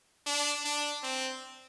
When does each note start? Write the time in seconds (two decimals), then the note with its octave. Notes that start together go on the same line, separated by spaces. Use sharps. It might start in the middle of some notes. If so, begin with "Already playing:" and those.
0.27 D4
0.65 D4
1.03 C4